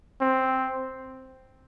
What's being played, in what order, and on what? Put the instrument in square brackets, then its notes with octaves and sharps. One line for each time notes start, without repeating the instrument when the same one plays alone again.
[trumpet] C4